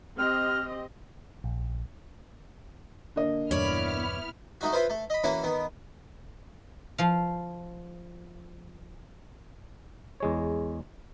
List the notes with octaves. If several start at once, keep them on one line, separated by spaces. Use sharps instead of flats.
C4 G4 D#5 F6
A#1
D3 A#3 D#5
E2 G2 B2 B3 E4 C#5 D5 F6
A3 D#4 F#4
E4 F4 B4 C5
A3
D#5 B5
E3 A#3 C#4 E4 F#4
D#3 B3
F3 F5
E2 G#3 C#5